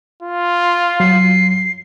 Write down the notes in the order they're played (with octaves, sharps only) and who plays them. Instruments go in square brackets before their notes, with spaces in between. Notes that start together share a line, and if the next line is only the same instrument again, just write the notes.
[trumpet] F4
[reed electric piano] F#3 [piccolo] C7